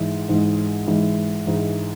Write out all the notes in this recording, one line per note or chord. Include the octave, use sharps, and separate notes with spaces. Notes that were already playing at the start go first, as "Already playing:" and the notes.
Already playing: G#2 E3 G#3 D#4
G#2 E3 G#3 D#4
G#2 E3 G#3 D#4
G#2 E3 G#3 D#4